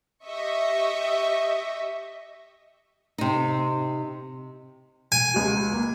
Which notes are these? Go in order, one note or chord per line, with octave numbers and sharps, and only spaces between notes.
G4 D#5 E5 C#6
C3 D#4
G#5 D7
C#2 F#4
A#3